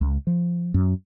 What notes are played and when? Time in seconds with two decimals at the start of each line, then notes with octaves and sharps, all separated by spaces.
0.01 C#2
0.27 F3
0.74 F#2